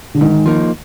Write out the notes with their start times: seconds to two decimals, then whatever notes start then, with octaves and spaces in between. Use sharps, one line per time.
0.14 D3
0.21 G#2 D#3
0.46 F3 A#3 D#4